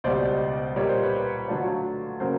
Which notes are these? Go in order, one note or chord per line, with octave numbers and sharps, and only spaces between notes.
C#2 B2 G3 C5 D5
A#2 G3 A#3 C#5
C5
B4 C#5
D3 F#3 A3 D4 F4
C#3 F#3 A#3 A#4 C5